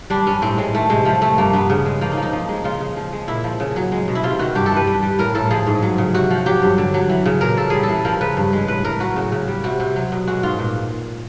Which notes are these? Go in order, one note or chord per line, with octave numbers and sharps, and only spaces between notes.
G3 D4
G2 C#4
A2 C4
A2 G#3
D#3 A3
C3 G#3
F3 A3
C3 A3
G2 A#3
G2 B3
C#3
G#3
F3 A#3
D#4
F3
D#4
F3
G#3
C#3 F4
C#3
F3
G#3
A#2 E4
F3
C#3
F#3
G#3
B2
E4
C3 F4
D#3 F#4
G2 G4
A4
E3 B4
G3
G3
A2 A#4
A2 A4
F3 G#4
G#2
F#3
C#3
C3 F#4
F3
F#3 G4
G2
D3
F#3
E3
C#3
A#2 A#4
A#2 A4
G3 G#4
A4
E3
F3 A#4
C#3 B4
G2
G#3
A2 B4
A2 A#4
F#3 F#4
C#3
C#3
G3
C3 F#4
C3
F#3
B2
G#3 F#4
G#2 F4
A#2